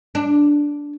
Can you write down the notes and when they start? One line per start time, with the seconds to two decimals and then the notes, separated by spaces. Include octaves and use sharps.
0.15 D4